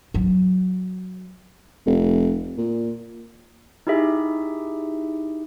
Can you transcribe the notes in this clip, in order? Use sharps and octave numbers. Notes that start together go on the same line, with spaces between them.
F#3
F1
A#2
D#4 E4 G4 G#4 E5